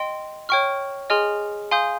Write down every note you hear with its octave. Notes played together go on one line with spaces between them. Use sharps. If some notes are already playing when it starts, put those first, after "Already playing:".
Already playing: D#5 G5 C6
C#5 G5 C#6 F6
G#4 D#5 G#5 C6 F6
F5 G#5 C6 D#6 G6